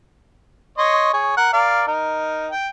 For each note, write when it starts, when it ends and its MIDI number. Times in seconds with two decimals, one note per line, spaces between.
0.78 1.09 73
0.78 1.09 75
0.78 1.09 84
1.13 1.34 68
1.13 1.34 73
1.37 1.50 70
1.37 1.50 78
1.53 1.84 70
1.53 1.84 74
1.53 1.84 77
1.87 2.49 63
1.87 2.49 70
2.51 2.68 79